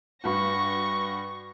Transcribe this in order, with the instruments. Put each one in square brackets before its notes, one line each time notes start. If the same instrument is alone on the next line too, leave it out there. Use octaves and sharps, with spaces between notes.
[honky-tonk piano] G2 F#4 [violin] C#6 A#6